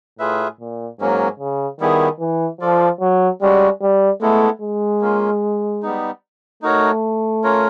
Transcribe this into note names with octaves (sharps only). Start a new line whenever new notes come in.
A2 F4 G#4 B4 E5
A#2
G#2 F#3 A#3 C#4
C#3
D#3 G3 B3 E4 G#4
E3
F3 F4 A4 D5
F#3
G3 G#3 C#4 F#4
G3
G#3 A3 B3 E4 A4
G#3
A#3 C#4 F4
G3 B3 D#4
A3 D#4 F#4 A#4 C#5
C#4 F4 A#4 C#5